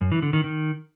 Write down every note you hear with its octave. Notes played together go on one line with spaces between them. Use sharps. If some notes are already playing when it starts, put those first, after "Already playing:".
F#2
E3
D3
D#3
D#3